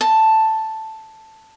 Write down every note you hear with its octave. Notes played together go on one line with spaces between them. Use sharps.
A5